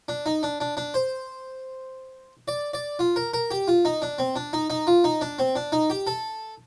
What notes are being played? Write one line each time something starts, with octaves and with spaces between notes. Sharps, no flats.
D4
D#4
D4
D4
D4
C5
D5
D5
F4
A#4
A#4
G4
F4
D#4
D4
C4
D4
D#4
D#4
F4
D#4
D4
C4
D4
D#4
G4
A4